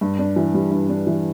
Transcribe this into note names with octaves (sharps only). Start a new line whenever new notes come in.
G2
D4
E3
G3
G2
D4
E3